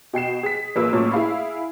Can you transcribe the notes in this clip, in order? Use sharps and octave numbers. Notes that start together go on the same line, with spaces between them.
B2 G5 C7 E7
G#4 B6
A1 A#3 F4 G#4 B4 E6
A2 F#3 A3 A#3 C#4 F4
E4 G#4 F5 B5